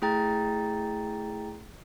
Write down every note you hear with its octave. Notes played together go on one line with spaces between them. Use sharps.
A3 E4 G#4 G5 A#5 A6